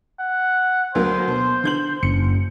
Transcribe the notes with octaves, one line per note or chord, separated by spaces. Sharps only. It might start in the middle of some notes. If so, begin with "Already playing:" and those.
F#5
D2 F#3 A#3 C5
B2
D3 G6 F#7
F#1 C#7